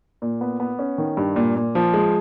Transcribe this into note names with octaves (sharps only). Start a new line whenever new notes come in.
A#2
B3
B3
C#4
D#3
G2
A#2
A#2
F3
G#3